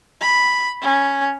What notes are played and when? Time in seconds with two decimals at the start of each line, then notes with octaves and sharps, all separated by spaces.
0.21 B5
0.82 C#4